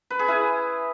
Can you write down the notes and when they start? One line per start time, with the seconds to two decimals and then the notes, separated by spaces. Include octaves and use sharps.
0.10 B4
0.19 G#4
0.28 E4